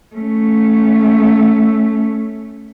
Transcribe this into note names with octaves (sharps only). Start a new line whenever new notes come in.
A3 C#4